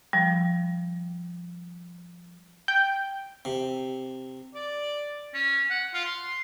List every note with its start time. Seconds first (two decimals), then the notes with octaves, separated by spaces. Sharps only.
0.13 F3 G3
2.68 G5
3.45 C3
4.55 D5
5.34 C#4
5.70 F#5
5.94 F4
6.05 C6